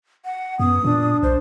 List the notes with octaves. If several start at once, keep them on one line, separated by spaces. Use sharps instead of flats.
F#5
F#2 B3 D#6
A#2 D4
B1 C5